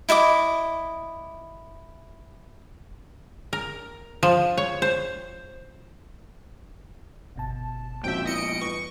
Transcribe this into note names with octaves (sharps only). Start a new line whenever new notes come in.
E4 D#5 F5 D6
A#4
F3
C#5
C5
G1 B2 A5
F2 A#2 C4 C#4 F#4 E5 G5
B3 E4 D#5 C#7 D7
B4 C#6